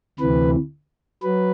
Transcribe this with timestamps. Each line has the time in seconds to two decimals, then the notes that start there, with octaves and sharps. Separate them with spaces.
0.19 D2 C3 E3 B4
1.23 F#3 B4